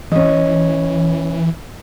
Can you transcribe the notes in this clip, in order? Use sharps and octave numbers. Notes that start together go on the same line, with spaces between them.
E3 C#4 D#5